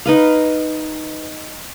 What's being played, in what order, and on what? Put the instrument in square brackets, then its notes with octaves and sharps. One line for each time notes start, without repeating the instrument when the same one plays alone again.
[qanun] D#4 B4 F5